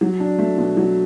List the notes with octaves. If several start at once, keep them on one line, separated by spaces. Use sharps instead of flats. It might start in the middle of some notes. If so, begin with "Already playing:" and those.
F#3
D4
A3
B2
F#3